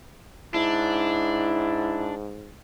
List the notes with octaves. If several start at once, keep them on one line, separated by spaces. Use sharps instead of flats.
G#2 D4 E4